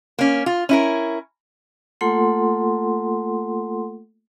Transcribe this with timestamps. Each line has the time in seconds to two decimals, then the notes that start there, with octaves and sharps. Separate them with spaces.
0.19 A#3 C#4
0.46 F4
0.69 C#4 E4 A#4
2.01 A3 A#3 F4 A4 F#5 C6